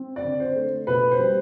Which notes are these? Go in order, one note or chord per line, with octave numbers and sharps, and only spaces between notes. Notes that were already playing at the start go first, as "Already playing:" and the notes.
Already playing: C4
D5
D3
C5
A3
B2 B4
C5
G3